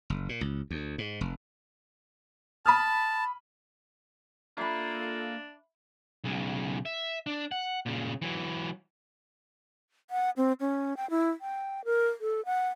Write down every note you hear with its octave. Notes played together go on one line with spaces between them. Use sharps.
F#1
A#2
C#2
D2
G#2
F1
A5 B5 D#6 F6
A#3 D4 F4 A4 E5 A#5 B5
B1 C#3
E5
D4
F#5
A#2 C#3
E3 F#3
F#5
C4
C#4
G5
E4
G5
A#4
A4
F#5